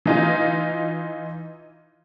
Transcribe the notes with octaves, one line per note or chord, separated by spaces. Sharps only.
E3 D#4 F4